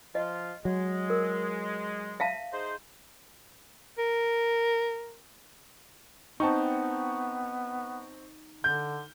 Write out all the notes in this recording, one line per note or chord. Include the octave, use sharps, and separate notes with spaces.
F3 F4 D#5
F#3 G#3
A#4
E5 F5 A5
D#4 G#4 C5
A#4
B3 C4 D#4 G5 A5 C#6
D3 G6